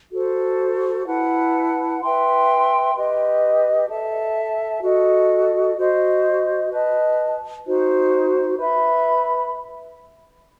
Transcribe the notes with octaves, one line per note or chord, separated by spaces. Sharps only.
F#4 A4 C5
E4 B4 F#5 A5
B4 E5 G5 C6
G4 B4 D#5
A4 E5 A5
F#4 A4 D#5
F#4 C5 D#5
B4 D#5 A5
D#4 F#4 C5
B4 E5 B5